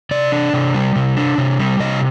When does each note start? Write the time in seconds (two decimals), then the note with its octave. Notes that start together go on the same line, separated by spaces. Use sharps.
0.11 C3 D5
0.32 D4
0.53 C3
0.74 G3
0.96 C3
1.17 D4
1.38 C3
1.59 G3
1.80 C3 D#5